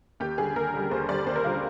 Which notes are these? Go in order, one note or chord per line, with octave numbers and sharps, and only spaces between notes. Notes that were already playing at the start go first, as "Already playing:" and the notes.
D#2 G4
D3 G3 G#4
D#2 A#4
D3 G3
D#2 C5
D3 G3 D5
D#2 C5
A#4
D3 G3 F4